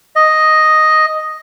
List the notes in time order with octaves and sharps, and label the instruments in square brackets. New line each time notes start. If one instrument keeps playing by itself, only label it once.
[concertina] D#5